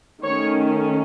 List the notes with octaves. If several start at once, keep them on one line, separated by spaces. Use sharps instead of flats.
D#3 A3 C#4 C#5